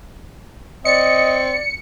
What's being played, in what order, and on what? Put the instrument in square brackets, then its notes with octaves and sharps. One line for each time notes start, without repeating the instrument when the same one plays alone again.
[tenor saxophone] C4 [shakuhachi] D5 [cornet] D#5 [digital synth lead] C#7